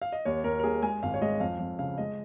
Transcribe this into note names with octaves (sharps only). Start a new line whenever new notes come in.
F5
D#5
D#2 C#5
D#2 A#4
A#4
D#2 G#4
G#3 G#5
G#1 F5
C#5
G#3 D#5
F2 F5
F2
C#3 F5
G#3 D#5